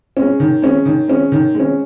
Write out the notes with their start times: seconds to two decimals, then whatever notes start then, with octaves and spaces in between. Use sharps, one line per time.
0.17 G#3 C#4
0.40 D#3
0.62 G#3 C#4
0.85 D#3
1.08 G#3 C#4
1.32 D#3
1.55 G#3
1.60 C#4